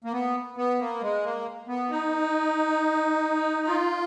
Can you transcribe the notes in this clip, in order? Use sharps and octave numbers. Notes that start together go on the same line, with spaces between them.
A#3
B3
B3
A#3
G#3
A#3
B3
D#4
F4